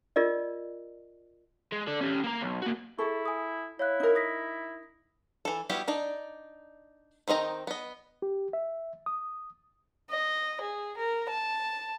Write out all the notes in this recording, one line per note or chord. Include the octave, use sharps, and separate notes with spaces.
F4 A#4 D5 D#5
G#3
A4 D5
C#4 G4
A#3 A#5
B1
A#3 F#4
E4 G#4 A4 C#6
G#5 D#6
E4 C#5 F5 F#6
D#4 A#4
D#6 A#6 B6
E3 A4
G3 B3 E4 F#4 G4
D4 D#4 D5
D#3 C4 D#4 D#5 A#5
B3 D#5
G4
E5
D#6
D#5
G#4
A#4
A5